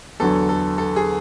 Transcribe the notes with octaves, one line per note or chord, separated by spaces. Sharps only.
E2 D3 F#3 A4
A4
A4
G#4